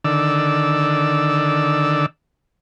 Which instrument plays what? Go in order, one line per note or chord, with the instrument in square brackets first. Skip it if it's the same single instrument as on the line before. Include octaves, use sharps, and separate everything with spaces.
[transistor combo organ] D3 D#3 D5 E6